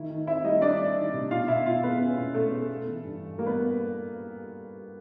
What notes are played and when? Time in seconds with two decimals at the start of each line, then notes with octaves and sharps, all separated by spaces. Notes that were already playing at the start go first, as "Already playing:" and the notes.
Already playing: D#3 E4
0.10 D#3
0.27 C4 E4 E5
0.44 G3 D#4 D#5
0.61 G3 D4 D5
0.79 C4
0.97 D#3
1.13 C3
1.31 B2 F4 F5
1.48 B2 E4 E5
1.65 B2 F4 F5
1.83 G#3 B3 B4
2.01 C#4
2.17 B2
2.34 B2 A3 A4
2.52 G#3
2.69 B3
2.87 E3
3.04 G2
3.21 E3
3.38 G3 A#3 A#4
3.46 B3 B4